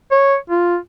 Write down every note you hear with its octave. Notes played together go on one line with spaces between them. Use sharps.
C#5
F4